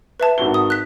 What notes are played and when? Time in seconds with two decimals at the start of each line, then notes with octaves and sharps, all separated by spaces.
0.20 B4 E5 A5
0.38 G#1 F#4 G7
0.54 D#6
0.70 F#6 B6